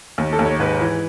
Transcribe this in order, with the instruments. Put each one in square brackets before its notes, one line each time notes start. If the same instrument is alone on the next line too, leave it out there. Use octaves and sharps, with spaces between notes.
[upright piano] D#2
A4
D#2
C#5
G#2 B4
E3